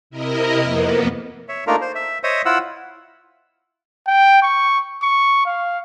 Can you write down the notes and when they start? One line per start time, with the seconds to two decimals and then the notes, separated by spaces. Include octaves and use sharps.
0.10 C3 E4 A#4 D#5
0.62 F2 A#3 B3
1.48 C#5 E5
1.67 A3 A#3 D4 D#4 F4 A#4
1.81 C5
1.95 E5
2.23 C5 C#5 D#5 E5 D#6
2.45 E4 F4 F#5 E6
4.07 G5
4.43 C#6
5.03 C#6
5.46 F5